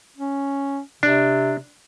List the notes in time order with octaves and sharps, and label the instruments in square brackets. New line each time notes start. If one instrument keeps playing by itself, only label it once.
[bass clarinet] C#4
[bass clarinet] C3 [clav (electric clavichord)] D4